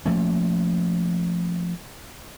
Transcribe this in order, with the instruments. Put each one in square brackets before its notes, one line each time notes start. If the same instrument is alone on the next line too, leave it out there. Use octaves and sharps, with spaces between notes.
[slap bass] F3 A3 A#3 C#4